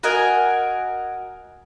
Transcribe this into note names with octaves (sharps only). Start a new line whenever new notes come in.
F#4 A#4 D#5 G#5